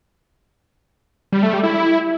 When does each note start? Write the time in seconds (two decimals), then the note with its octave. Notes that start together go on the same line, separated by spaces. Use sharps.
1.32 G3
1.43 A3
1.53 G3
1.64 E4